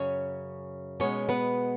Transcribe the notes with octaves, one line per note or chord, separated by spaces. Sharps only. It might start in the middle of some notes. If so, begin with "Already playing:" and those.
Already playing: F#2 C#3 C#4 C#5
B2 G#3 B3 C#4 C#5
B3 B4